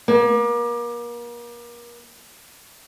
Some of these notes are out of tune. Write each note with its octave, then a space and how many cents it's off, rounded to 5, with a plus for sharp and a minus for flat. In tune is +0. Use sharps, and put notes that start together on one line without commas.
A#3 +35